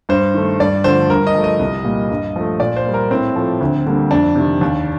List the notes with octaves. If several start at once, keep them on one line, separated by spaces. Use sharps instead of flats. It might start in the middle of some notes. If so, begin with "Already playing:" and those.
G2 C5
D#3 A3
G2 D5
D3 F3 A3 C5
G2 A#4
D#5
F3 A3
D#5
C2
A#2 G3 A#3
G2
F3 A3
A#2 D5
C5
G3 A#3
A#4
A2 C4
F3 A3
D2
D3 G3 A#3
F2 D4
C3 D#3
D#2